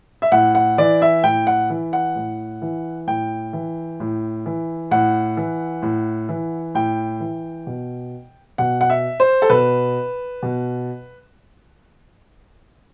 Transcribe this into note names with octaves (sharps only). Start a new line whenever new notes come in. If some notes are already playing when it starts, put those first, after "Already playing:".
E5
A2 F#5
F#5
E3 D5
E5
A2 G5
F#5
E3
F#5
A2
E3
A2 G5
E3
A2
E3
A2 F#5
E3
A2
E3
A2 G5
E3
B2
B2 F#5
F#5
E5
C5
A4
B2 B4
B2